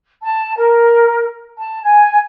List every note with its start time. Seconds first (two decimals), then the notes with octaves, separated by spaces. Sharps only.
0.21 A5
0.56 A#4
1.57 A5
1.82 G#5